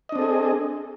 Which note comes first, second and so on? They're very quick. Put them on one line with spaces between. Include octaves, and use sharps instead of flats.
D#5 D4 C4 A4 G#4